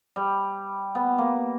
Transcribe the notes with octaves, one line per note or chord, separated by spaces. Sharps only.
G3
B3
A#3